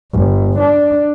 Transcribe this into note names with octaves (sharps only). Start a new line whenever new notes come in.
G1
D4